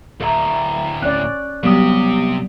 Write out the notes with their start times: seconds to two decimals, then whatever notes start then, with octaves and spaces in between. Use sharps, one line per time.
0.21 D2 A2 A4 E5 A#5
1.02 C#4 D5 F#6
1.63 C3 F#3 G3 B3 G4 D#6